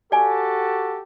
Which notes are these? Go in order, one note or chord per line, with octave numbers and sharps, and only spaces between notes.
F#4 G4 A4 D5 G#5